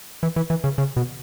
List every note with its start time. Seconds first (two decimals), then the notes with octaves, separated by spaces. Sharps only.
0.23 E3
0.36 E3
0.50 E3
0.64 C#3
0.78 C#3
0.97 B2